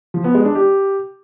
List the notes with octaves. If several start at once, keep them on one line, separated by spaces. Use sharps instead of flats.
F3
B3
G#3
D4
G4